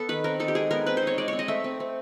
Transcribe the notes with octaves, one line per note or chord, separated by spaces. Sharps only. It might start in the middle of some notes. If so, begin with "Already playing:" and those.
Already playing: B3 A4
D#3 B4
C4 A#4
D#4 A4
G4
G#3 G#4
B3 A#4
C4 B4
C5
D#4 C#5
G#3 D5
C4 C#5
D#5
A3 E5
C4
C4